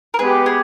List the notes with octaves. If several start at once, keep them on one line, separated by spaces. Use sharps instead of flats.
A#4
G#3 B3 G4 G#4 B4
G#4